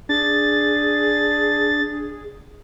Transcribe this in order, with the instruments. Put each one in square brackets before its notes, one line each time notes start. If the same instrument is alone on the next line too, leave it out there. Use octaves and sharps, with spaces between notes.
[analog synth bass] D4 [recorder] G#4 [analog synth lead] A6